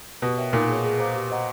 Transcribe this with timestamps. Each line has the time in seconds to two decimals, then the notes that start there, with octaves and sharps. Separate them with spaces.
0.22 B2 G4
0.37 A#4 C#5 E5 G5
0.53 A#2 D#4
0.68 G#4 C#5
0.84 G#4
0.99 C5 F5 A#5 D6
1.15 G4
1.30 C5 D#5 F#5 A#5